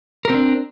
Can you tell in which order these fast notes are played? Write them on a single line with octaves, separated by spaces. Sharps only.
A#4 C4 D4